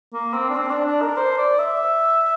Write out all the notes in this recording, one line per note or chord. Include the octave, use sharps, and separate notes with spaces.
A#3
C4
D4
C4
D4
D4
A#4
C5
D5
E5